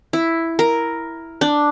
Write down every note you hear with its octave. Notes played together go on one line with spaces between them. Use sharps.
E4
A#4
D4